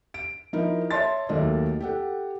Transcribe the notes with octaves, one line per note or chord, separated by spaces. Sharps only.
D7
F3 D#4 E4 A#4
C#5 D#5 E5 A5 C6 A6
D#2 F#3 A3 A#3 D#5
G4 A4 F#5